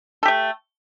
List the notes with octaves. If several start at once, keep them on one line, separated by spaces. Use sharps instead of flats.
A3 G4 A4